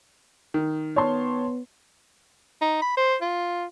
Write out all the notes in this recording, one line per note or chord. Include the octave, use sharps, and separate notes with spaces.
D#3
B3 C#5 A5 C6
D#4
B5
C5
F4